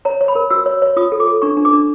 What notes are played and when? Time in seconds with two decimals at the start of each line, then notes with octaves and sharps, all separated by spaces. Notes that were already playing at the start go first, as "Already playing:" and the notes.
0.05 C#5 A#5
0.21 C#5
0.28 B5
0.35 A#4
0.50 F#4 E6
0.66 C#5
0.82 C#5
0.97 F4 D#6
1.12 A4
1.20 D6
1.27 A4
1.42 D4 C#6
1.57 D4
1.65 D6
1.73 D4